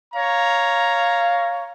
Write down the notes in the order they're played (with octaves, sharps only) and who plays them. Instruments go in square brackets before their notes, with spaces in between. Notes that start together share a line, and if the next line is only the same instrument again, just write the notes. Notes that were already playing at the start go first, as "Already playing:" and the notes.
[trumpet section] C#5 A#5 [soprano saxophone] F5